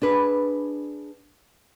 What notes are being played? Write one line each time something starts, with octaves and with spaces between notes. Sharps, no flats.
D4 G#4 B4